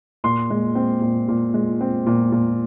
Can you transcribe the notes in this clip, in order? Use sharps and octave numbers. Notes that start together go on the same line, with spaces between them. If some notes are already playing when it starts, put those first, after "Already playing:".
A#2 C6
G#3
C4
A#2
A#2
G#3
C4
A#2
A#2